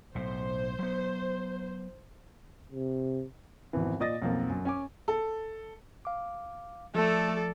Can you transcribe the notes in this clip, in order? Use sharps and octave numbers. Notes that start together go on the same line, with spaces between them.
B1 A2 C5
F#3 B3
C3
G#1 F2 B2 E3
A#2 D5 D#5 D#6 A6 A#6
B1 F2 A#3
F#2
C#4 G#5 D6
A4
F5 D6
F3 A3 A4 D5